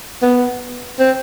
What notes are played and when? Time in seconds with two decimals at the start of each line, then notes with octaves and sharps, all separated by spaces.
0.22 B3
0.99 C4